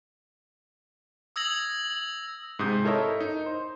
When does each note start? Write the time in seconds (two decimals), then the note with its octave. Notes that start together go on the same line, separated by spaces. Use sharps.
1.36 D#6 E6 G#6 A#6 F#7
2.59 G#2 C3 D#6 G6
2.85 E4 A4 A#4 C#5 D#5 E5
3.20 D#4
3.46 C5